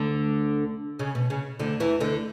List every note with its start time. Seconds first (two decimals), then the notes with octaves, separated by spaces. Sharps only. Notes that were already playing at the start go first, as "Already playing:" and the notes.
Already playing: D2 D3
0.99 C#3
1.15 B2
1.30 C#3
1.59 D2 D3
1.80 E2 E3
2.00 D2 D3